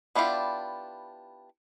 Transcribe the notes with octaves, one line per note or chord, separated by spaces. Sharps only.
B3 D4 E4 F4 G4